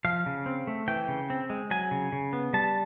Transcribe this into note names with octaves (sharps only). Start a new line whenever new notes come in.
F3 F5
C#3
C4
A3
E3 G5
C#3
C4
G#3
F#3 G#5
C#3
C#3
B3
G3 A5